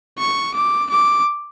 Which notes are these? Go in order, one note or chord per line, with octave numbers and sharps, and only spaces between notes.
C#6
D6
D6